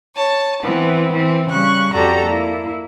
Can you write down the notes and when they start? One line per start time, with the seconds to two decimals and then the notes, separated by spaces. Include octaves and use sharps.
0.15 C#5 A5
0.62 E3 B3 C4
1.12 E3 C4
1.49 C#3 G3 C#6 F#6
1.93 F2 F#4 G4 A4 D5 A#5
2.26 A#3 E4